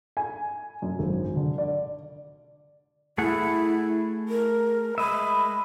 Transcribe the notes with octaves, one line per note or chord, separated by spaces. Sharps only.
G#5
F#2
G#1
D3
D5
A3 E4 G#4 F#5
A#4
G#3 D#5 E5 B5